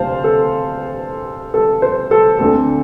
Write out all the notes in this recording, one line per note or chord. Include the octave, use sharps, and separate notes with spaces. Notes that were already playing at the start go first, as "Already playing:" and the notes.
Already playing: D2 C3 C5 F5 A5
A4
A4
C5
A4
D2 D3 A3 C4 A4